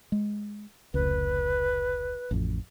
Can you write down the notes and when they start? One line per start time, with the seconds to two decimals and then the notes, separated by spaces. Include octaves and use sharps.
0.12 G#3
0.94 F1 C#2 B4
2.31 A1 F2